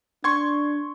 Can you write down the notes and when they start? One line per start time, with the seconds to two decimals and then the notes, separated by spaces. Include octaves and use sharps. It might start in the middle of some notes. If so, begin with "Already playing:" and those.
0.24 D4 C6 C#6 G#6